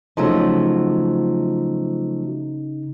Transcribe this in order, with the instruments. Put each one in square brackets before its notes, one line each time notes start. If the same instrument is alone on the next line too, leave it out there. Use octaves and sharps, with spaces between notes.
[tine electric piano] C#3 D#4 [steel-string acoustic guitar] F3 F#3 A3